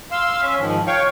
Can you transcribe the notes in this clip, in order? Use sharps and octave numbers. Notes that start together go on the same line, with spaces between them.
F5 C6 E6
C#4 E5
G#2 D#3 F3
C#5 F5 G5 C#6